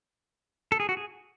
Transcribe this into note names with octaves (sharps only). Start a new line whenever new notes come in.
A4
G#4
F#4
G#4